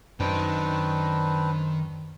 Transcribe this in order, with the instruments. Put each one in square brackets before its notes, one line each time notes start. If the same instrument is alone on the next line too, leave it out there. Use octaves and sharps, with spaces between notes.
[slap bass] F#2 [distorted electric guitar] D#3 G5 [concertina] C4 D4 B4